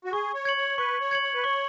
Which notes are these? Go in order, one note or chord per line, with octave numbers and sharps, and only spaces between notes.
F#4
G#4 C#6
C#5
G#6 C#7 F#7
C#5
B4 C#6
C#5
G#6 C#7 F#7
C#5
B4
C#5 C#6